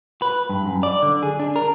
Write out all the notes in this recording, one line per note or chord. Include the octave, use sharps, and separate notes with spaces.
B4
G2
F#2
D5
D3
G#4
D4
A#4